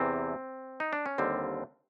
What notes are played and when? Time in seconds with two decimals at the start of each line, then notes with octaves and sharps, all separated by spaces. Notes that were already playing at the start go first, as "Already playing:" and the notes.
Already playing: E2 C3 E3 C4
0.80 D#4
0.93 D4
1.06 C#4
1.18 D#2 D3 G3 C4